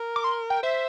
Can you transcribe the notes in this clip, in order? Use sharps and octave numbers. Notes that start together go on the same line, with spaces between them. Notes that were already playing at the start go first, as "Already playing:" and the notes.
Already playing: A#4
D6
C6
G5
C5 E5